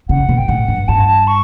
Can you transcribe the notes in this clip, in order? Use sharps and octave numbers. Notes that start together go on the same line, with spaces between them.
C#3 F#5
B2
G5
A2 F#5
G2
G2 A5
C#6